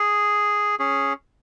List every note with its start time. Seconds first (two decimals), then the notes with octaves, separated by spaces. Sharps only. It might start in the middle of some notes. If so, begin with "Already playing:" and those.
Already playing: G#4
0.79 C#4 G#4